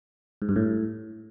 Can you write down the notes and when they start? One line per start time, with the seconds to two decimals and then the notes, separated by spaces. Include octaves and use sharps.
0.42 G#2
0.49 G2
0.56 A2